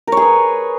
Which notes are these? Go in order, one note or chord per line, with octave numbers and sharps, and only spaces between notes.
G#4 A#4 B4 C#5